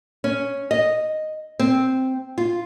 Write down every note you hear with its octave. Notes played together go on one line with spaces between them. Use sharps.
C#4
D#5
C4
F4